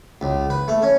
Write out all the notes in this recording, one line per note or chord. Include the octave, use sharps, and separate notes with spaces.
C#2
B4
A3
C#4